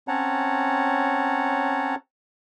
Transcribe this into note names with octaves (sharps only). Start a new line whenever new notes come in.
C4 C#4 C#5 F#5 A5 A#5